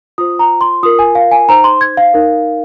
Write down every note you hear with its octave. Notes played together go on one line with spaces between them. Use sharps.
F4 C5 D#6
A#5
C6
F4 A#4 D#6
G#5
F5
G#5
D#4 C5 A#5
C6
G#6
F5
D#4 A#4